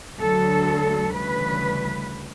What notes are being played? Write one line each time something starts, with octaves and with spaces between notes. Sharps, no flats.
D2 D3 F#3 A4
D2 C#3 E3 G3 B4